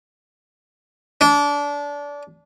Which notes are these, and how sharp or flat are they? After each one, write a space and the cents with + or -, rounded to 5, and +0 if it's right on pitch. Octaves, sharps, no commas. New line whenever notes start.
D4 -25